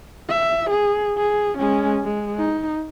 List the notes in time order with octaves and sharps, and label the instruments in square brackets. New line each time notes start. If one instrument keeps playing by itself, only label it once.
[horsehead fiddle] E5
G#4
G#4
G#3 C#4
G#3
D#4